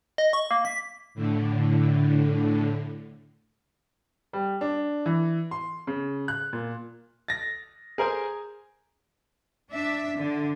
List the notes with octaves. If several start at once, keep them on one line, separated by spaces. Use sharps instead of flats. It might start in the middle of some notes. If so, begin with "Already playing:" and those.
D#5
C#6
A#3
B6
A2 D3
G3
D4
E3
C6
C#3
F#6
A#2
A6 A#6
G#4 A#4 C5 G#5
D4 E5
D3